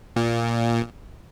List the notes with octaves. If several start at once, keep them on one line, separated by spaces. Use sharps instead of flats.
A#2